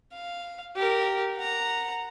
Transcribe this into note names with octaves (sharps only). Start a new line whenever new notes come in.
F5
G4 A#4
F#5 A#5